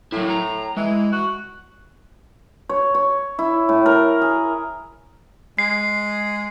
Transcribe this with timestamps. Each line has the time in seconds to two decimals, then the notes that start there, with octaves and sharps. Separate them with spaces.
0.12 A2 F#3 E4
0.30 A#5
0.77 E3 G#3
1.12 F#4
2.69 C#5
2.95 C#5
3.39 E4
3.69 A2
3.86 A#4
4.21 G#4
5.59 G#3 C7